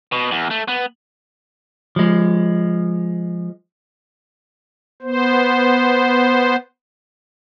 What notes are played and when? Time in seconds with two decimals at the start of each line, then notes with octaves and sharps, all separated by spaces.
0.12 B2
0.31 E2
0.51 A3
0.68 B3
1.96 F3 G#3
5.02 B3 C5